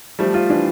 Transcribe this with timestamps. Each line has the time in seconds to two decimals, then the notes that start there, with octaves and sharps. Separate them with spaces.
0.19 F3 G3 A3
0.34 F3 F4
0.49 E3 D4